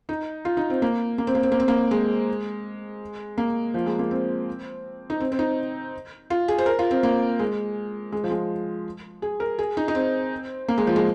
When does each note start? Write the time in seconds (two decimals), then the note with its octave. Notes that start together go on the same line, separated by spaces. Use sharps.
0.09 D#4
0.45 F4
0.57 D#4
0.70 C4
0.82 A#3
1.18 A#3
1.27 C4
1.35 A#3
1.43 C4
1.52 A#3
1.60 C4
1.68 A#3
1.91 G#3
3.38 A#3
3.74 F3
3.86 G#3
3.99 A#3
4.11 C4
5.10 D#4
5.20 C4
5.32 C4
5.39 D#4
6.30 F4
6.48 G#4
6.58 C5
6.66 A#4
6.79 F4
6.91 C4
7.03 A#3
7.39 G#3
8.12 G#3
8.24 F3
8.31 G#3
9.22 G#4
9.40 A#4
9.59 G#4
9.77 D#4
9.88 D#4
9.95 C4
10.68 A#3
10.78 G#3
10.87 F3
10.96 G#3